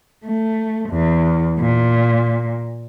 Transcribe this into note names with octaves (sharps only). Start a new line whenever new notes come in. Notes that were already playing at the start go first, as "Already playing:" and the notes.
A3
E2
A#2